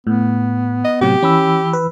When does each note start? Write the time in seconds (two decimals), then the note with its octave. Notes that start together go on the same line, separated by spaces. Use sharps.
0.07 A2 B3
0.85 D#5
1.01 A2 C3 F#3 G4
1.23 E3 C#4 B5 E6
1.73 B4